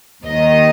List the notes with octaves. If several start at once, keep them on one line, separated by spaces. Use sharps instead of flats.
D#2 D#3 D#5